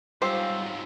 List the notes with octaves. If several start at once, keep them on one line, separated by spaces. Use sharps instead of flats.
G#2 F#3 G3 F4 G4 C5 F5 E6